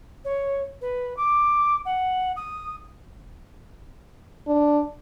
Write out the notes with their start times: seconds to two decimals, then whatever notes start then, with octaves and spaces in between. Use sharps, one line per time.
0.25 C#5
0.82 B4
1.17 D6
1.85 F#5
2.36 D#6
4.47 D4